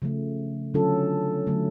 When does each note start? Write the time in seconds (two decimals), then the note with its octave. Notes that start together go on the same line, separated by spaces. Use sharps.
0.02 C#3 F3 A3
0.74 D3 F#3 C#4 F4 A4
1.47 D3 F#3 A3